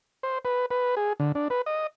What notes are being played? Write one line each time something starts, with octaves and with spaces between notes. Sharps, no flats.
C5
B4
B4
G#4
D3
D4
B4
D#5